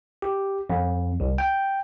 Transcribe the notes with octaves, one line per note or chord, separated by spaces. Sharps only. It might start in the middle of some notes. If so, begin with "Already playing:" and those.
G4
F2
C2
G5